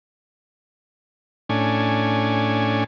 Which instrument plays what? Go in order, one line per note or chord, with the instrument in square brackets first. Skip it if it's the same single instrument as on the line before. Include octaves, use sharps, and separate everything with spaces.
[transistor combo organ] A2 C#4 D4 G#5